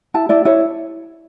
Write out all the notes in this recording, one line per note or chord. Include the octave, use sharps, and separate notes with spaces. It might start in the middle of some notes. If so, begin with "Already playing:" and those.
E4 A5
E4 D5
E4 C#5